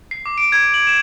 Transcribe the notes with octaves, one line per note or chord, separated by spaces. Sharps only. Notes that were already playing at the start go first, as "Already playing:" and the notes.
C7
D6
D7
G#6
F#7
E7